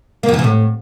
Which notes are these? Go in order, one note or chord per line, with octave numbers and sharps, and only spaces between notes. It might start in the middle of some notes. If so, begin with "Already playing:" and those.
A#3
F2
E3
C3
A2